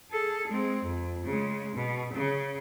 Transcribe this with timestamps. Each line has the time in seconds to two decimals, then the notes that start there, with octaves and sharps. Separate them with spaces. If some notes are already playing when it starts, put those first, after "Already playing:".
0.11 G#4 A4
0.48 G#3 C4
0.84 F2
1.24 C#3 G#3
1.76 B2
2.13 C#3